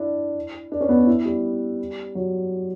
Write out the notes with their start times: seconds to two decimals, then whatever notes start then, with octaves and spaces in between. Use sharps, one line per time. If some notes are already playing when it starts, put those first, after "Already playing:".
Already playing: D4 E4
0.72 D4
0.81 C#4
0.89 B3
0.98 D4
1.07 E4
1.25 G3
2.15 F#3